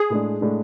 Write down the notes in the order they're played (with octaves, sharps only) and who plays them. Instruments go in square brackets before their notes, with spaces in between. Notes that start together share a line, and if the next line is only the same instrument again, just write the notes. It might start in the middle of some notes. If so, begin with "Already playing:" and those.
Already playing: [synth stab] G#4
[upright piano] A2 G#3 D4
A2 G#3 D4